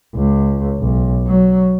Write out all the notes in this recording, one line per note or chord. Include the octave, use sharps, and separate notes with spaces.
C#2
B1
F#3